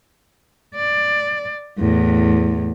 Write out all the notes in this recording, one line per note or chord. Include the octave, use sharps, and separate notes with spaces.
D5
E2 A2